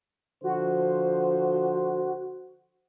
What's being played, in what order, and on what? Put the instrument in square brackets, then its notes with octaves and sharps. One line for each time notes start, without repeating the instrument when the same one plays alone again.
[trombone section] D3 F3 C5 [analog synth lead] F#4